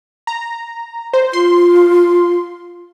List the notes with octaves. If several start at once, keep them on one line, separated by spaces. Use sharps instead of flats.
A#5
C5
F4 C6